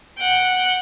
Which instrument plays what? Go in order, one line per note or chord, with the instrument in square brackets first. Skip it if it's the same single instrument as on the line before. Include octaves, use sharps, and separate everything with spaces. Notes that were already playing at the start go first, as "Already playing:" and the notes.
[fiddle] F#5 G5